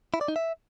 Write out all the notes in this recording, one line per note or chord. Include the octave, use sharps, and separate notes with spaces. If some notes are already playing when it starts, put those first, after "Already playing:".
E4
D5
D#4
E5